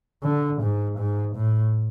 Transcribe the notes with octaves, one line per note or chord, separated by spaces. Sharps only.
D3
G#2
G#2
A2